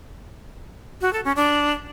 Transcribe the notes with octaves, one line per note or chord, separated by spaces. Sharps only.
F#4
A4
C#4
D4